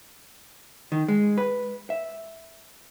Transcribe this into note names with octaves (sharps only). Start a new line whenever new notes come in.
D#3
G#3
B4
E5